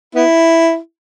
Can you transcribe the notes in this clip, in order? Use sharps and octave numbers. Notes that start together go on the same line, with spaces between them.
B3 E4